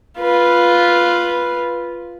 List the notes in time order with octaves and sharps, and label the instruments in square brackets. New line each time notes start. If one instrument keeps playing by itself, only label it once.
[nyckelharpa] F4 B4